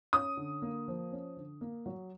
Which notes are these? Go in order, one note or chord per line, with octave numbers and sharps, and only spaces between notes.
C#4 D#6
D3
A#3
F3
C#4
D3
A#3
F#3